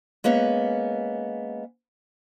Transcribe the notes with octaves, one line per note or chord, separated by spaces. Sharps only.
G#3 A#3 B3 C#4